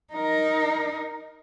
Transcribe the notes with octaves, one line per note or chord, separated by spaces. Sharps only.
D#4 A#4